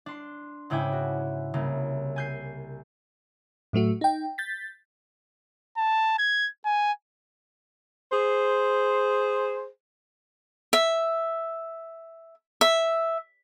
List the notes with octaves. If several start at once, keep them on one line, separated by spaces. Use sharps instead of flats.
D4 C6
G#2 C#3 E4 G5 G#5 D6
F#4
C2 C#3 A#3
G#5 G6 C7
A2 F#3 A3 F#4
D#4 G5
G6 A6 B6
A5
G#6
G#5
G#4 C5
E5
E5